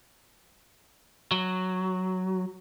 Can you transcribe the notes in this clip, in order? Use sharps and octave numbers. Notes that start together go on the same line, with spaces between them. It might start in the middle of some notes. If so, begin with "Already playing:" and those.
F#3